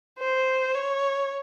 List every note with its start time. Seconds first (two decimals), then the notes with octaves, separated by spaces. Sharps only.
0.19 C5
0.75 C#5